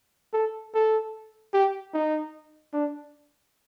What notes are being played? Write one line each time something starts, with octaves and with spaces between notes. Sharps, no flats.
A4
A4
G4
D#4
D4